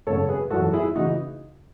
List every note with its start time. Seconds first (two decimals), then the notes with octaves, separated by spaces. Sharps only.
0.07 G#1 F#2 C#3 A4 C#5
0.28 G#4 B4
0.50 G#1 F#2 E3 F#4 A4
0.73 E4 G#4
0.95 C#3 E3 D#4 F#4